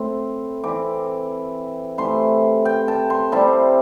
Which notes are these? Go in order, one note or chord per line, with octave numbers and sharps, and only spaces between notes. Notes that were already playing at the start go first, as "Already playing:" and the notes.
Already playing: A2 C4 E4 C6
E3 C4 E4 D6
C3 E3 A3 C6
G5
A5
C6
C3 G3 C4 E4 A5